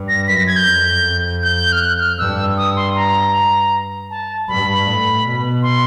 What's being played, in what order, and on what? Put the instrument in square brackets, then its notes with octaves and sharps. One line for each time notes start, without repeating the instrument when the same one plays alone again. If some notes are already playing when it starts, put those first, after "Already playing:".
Already playing: [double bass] G2
[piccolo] A#6
[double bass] F#2 [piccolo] B6
[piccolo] A#6
G#6
G6
[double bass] F2
[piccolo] G6
F6
F#6
F6
[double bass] G2 [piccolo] E6
[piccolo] D#6
C6
A#5
A5
[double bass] G2 [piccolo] B5
[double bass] A2
B2
[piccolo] C6